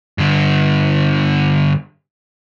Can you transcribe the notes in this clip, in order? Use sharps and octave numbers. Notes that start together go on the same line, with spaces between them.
G2 D3